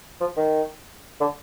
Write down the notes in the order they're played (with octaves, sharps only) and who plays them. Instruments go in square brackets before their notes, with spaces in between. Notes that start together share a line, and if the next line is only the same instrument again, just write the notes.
[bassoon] F3
D#3
D3